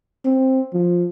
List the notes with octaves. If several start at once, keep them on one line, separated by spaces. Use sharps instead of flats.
C4
F3